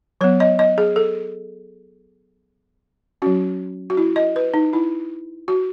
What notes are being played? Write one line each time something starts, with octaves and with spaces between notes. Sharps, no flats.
F#3 B3 C#5
D#5
D#5
G#4
A4
F#3 C#4 F#4
F#4
E4
D#5
B4
D#4
E4
F#4